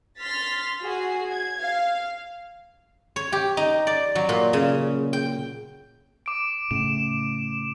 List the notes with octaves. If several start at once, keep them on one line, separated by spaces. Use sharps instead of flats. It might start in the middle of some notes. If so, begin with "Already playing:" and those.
C6 F6 A6 B6
F#4 G#4 C7
G#6
F5
C#5
G4
D#4
D5
F#3
A#2
C#3
G5
D6 D7
A2 C#3 E7